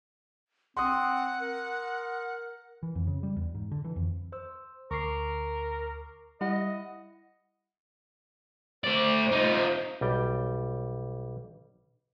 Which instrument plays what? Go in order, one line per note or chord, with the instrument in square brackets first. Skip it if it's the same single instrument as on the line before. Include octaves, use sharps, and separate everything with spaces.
[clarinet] C4 [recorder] F#5 [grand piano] C6 D#6
[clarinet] A#4
[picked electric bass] E3
F2
C#3
G3
E2
G#2
D3
E3
F2
[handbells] C5 E6
[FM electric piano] D2 [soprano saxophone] A#4 [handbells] C#6 D6 C7
[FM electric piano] G3 [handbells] E4 F#5 [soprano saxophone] D#5
[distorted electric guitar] A3 D5 [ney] C5
[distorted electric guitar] D#4 F4
[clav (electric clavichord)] B1 G3 G5